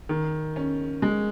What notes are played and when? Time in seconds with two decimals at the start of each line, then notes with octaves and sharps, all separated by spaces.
0.09 D#3
0.56 C#4
1.02 G#3